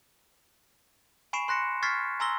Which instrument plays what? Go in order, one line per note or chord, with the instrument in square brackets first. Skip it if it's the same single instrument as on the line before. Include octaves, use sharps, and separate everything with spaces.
[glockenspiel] G#5 B5 C#6 C7 D7 E7
C6 F#6 A#6 C#7 E7
C#6 F6 G#6 A6 B6 C7
G#5 A#5 C6 E6 A#6 G7